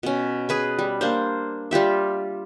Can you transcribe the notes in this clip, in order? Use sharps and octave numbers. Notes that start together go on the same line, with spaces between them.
B2 C#4
G#4 B4 G#5
G3
A#3 D4 C5
G3 F4 G4 E5